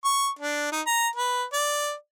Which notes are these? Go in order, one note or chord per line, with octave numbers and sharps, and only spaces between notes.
C#6
D4
D#4
A#5
B4
D5